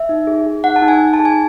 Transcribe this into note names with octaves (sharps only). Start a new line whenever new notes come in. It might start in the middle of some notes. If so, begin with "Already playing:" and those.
Already playing: E5
D#4
G#4
G#4
D#4 F#5
A5
D#4
G#5
D#4
A5
G#4
G#5